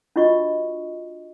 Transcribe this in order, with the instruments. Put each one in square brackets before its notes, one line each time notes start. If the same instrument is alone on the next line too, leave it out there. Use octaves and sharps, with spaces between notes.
[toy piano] D4 F4 F#4 D#5 C#6